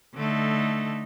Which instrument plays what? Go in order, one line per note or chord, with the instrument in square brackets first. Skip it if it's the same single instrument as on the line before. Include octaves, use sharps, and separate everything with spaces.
[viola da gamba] D3 A3 D#4